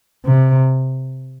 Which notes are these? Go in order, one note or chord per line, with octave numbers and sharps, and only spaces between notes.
C3